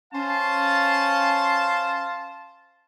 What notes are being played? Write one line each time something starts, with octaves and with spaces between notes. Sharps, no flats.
C#4 C5 F5 A5